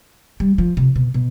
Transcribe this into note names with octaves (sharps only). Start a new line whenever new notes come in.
G3
F3
C3
B2
B2